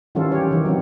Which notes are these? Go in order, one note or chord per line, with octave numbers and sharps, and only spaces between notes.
D#3 E3 G3 C#4 F4 A4
G4 C#5
D#3 E3
F#3 C4